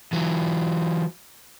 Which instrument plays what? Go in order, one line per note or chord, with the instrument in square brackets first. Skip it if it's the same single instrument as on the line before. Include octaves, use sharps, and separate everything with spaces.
[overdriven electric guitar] E3 F#3